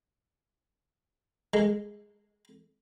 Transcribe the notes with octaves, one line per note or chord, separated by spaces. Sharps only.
G#3